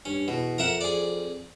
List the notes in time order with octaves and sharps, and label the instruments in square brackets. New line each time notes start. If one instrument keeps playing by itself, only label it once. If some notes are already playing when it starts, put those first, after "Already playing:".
[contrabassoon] G2 [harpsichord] C#4
[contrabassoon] E2 [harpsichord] B2
[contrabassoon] F2 [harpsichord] A#4 E5 F#5
[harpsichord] G#4 D5